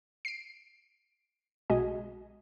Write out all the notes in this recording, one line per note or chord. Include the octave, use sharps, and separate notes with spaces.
C7 D7
B1 G#3 F#4 D#5 G#5